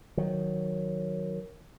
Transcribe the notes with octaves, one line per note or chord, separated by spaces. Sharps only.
D#3 F#3